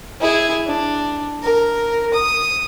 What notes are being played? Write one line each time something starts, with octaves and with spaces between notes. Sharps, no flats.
E4 G#4
D4
A#4
D#6